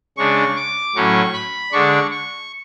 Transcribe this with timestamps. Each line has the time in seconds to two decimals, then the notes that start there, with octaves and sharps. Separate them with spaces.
0.17 C#3 G#3 D4 C#6
0.56 D6
0.95 A2 F#3 C#4 C#6
1.33 B5
1.72 D3 G#3 D4 C#6
2.11 C#6